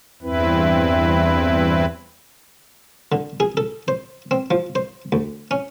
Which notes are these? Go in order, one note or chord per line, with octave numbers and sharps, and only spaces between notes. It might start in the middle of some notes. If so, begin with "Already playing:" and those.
E2 G2 C4 E4 B4
D3
G#4
A4
C5
C4
F3
C5
D2
C#4